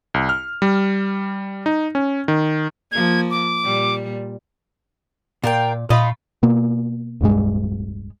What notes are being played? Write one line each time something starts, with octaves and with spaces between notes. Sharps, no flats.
C2
F6
G3
D#4
C#4
D#3
F3 A#3 G#6
D6
A#2 G3
A#2 F4 A#4 G5
A#2 A3 F4 D#5 B5
B2 A#3
D1 B1 G2 G#3